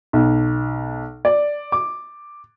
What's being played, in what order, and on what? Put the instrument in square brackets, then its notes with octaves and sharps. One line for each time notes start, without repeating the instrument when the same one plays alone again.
[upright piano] B1
D5
D6